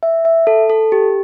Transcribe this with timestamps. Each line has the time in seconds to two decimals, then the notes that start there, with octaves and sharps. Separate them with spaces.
0.03 E5
0.25 E5
0.47 A4
0.70 A4
0.92 G4